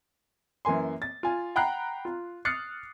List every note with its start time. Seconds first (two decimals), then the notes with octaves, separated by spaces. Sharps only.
0.65 F#2 E3 A#3 G#5 C6
1.02 A6
1.23 F4 G#5
1.56 F#5 G5 A#5 B5 F#6 C7
2.05 F4
2.45 D#6 F6 F#6 A6 C7 C#7